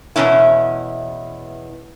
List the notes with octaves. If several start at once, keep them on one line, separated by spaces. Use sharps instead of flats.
E2 G2 B2 C#4 E4